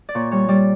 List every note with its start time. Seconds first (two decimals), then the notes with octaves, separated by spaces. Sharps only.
0.09 D5
0.15 A#2 C#5
0.32 G3 C#5
0.48 G3 D5